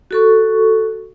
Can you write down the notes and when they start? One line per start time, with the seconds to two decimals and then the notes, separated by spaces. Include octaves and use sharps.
0.11 F#4 A4 C#6